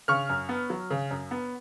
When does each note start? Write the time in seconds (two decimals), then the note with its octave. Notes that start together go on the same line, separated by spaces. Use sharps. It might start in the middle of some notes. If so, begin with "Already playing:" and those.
0.08 C#3 C#6 F6
0.29 F#2
0.49 B3
0.70 F#3
0.90 C#3
1.11 F#2
1.31 B3